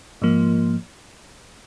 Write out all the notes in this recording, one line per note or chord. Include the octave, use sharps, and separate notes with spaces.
G#2 F3 A#3